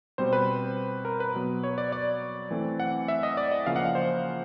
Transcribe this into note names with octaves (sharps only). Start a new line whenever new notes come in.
B2 G3 C4 C5
B4
A#4
B4
B2 F#3 B3
C#5
D5
D5
E3 A3 C4
F#5
E5
D#5
D5
D#5
C#3 F3 A#3 C#4 F5
F#5
F5
C5